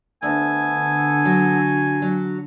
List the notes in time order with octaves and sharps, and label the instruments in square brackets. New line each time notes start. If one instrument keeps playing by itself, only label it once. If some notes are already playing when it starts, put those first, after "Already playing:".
[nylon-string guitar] D2 [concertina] B3 A4 [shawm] G#5
[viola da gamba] D3
[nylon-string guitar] F#3
F#3